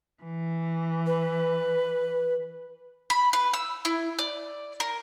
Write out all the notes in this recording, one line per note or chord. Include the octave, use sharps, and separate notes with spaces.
E3
B4
B5
B4
E6
E4
D5
A#4